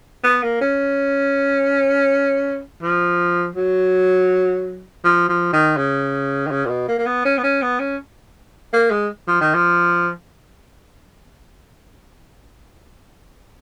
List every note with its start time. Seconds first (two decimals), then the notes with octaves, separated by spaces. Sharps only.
0.24 B3
0.42 A#3
0.61 C#4
2.82 F3
3.56 F#3
5.04 F3
5.29 F3
5.53 D#3
5.77 C#3
6.47 D#3
6.51 C#3
6.65 A#2
6.69 B2
6.88 A#3
6.98 A#3
7.06 B3
7.25 C#4
7.38 B3
7.43 C#4
7.62 B3
7.80 C#4
8.73 A#3
8.91 G#3
9.27 F3
9.41 D#3
9.54 F3